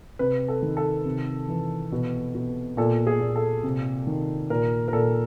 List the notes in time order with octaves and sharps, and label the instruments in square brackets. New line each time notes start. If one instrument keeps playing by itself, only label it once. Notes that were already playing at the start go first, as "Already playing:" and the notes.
[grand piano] C3 B4
A4
D#3
A4
C3
E3
B2
B2
A#2 A4
G#4
A#2
A4
C3
D#3
A#2 A#4
A#4
A#2 A4